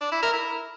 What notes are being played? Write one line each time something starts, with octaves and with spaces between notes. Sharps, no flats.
D4
E4
A#4
E4